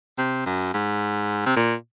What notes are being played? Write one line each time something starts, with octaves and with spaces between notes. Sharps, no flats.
C3
F#2
G#2
C3
A#2